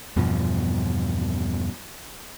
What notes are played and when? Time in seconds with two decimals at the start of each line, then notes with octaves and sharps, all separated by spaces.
0.16 E2 G2 B2 F3